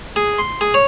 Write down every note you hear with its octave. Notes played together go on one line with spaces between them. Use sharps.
G#4
C6
G#4
C#5